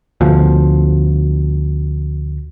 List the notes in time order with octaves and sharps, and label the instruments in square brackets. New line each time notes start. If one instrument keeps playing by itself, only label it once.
[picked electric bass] D2 B2 F3